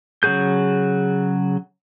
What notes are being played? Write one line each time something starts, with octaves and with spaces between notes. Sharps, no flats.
C#3 F#3 F#4 G#4 G6